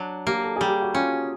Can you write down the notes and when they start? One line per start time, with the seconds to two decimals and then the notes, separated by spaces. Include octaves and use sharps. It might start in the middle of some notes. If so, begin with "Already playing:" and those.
Already playing: F#3 D4
0.27 A#3 G4
0.43 A4
0.56 G3 G#4
0.68 G4
0.82 F#4
0.94 C#4 F4